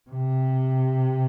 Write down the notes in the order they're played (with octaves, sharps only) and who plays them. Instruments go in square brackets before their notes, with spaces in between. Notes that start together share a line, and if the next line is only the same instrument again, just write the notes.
[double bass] C3